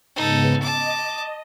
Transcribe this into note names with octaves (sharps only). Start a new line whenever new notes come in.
G#2 C#3 B3 D#4 A4
D#5 A5 D6